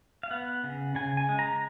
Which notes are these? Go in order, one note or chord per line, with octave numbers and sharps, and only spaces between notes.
F5
B3 F#5
C#3
C#3 G#5
G#5
G#3
A#5